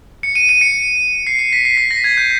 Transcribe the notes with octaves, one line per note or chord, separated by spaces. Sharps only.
C#7
D#7
D#7
C#7
C7
C7
B6
C7
B6
A#6
G#6
G6